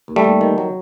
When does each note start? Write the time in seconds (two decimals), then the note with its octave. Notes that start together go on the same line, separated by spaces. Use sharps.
0.08 D#2
0.16 G3 A3
0.24 D#2
0.41 D#3
0.58 F#3